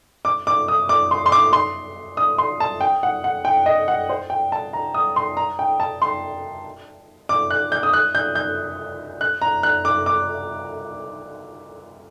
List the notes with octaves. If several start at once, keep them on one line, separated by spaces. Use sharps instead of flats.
D6
D6
D#6
D6
C6
C6
D6
C6
D#6
C6
A5
G5
F#5
F#5
G5
D#5
F#5
C5
G5
A5
A#5
D#6
C6
A#5
G5
A5
C6
D6
F#6
G6
D#6
F#6
G6
G6
F#6
A#5
F#6
D6
D6